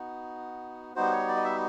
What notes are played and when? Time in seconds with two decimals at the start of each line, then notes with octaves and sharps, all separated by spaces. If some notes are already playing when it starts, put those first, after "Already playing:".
Already playing: B3 D#4 F#4
0.95 G3 B3 D#4 F#4 C5
1.12 C#5
1.28 D5
1.36 D#5
1.44 E5